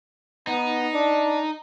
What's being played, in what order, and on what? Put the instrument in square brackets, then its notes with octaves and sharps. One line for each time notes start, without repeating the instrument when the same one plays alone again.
[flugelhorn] B3 [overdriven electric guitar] D#4
[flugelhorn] D4